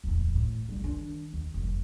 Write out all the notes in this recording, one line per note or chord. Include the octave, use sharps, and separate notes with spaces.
D1 E2
A2
F#1 G3
D#3 D4
D#2
F1 F#2